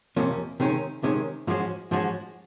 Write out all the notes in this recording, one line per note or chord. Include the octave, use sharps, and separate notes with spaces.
F2 C3 F3 A#3 C#4
C3 D#3 G#3 C#4
C3 D#3 G#3 C#4
G#2 F3 G#3 C#4 F#4
G#2 F3 G#3 C#4 F#4